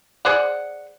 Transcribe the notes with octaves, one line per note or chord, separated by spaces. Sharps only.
G#4 C5 D5 F#5